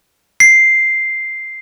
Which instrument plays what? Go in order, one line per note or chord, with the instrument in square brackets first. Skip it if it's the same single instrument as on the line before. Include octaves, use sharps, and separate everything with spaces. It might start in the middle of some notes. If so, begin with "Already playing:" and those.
[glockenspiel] C7